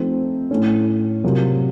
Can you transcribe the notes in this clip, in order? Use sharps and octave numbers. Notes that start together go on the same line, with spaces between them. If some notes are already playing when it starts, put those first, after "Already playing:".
Already playing: F3 A3 C4 D#4
A2 A3 C#4
C3 F#3 A#3 F4